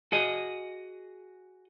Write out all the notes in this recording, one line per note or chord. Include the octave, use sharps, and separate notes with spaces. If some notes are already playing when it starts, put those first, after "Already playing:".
F#4 G#4 D#5